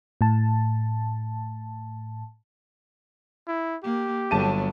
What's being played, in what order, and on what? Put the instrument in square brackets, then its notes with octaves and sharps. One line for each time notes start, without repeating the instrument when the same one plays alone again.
[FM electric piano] A2 A5
[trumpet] E4
[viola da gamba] A#3 [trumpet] G4
[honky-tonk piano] G1 A5 D#7 [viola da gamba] F#3 B3